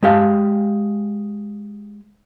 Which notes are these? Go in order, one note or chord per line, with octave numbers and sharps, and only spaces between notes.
G#3 G4 F5